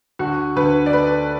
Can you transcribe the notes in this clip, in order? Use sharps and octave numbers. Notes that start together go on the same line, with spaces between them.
D2 F#4
D2 B4
D5
A3 B4